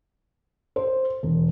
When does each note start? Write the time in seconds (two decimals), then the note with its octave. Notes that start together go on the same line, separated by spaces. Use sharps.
0.76 C5
1.23 E1